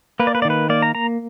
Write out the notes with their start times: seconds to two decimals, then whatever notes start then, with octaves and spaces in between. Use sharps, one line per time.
0.20 A#3 B4
0.27 D5
0.35 B4
0.42 D5
0.45 D#3
0.50 B4
0.70 A#3 D5
0.82 A#5
0.95 A#3 A#5